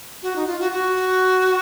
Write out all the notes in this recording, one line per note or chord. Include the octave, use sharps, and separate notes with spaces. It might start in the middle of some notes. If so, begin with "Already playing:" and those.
F#4
D#4
F4
F#4
F#4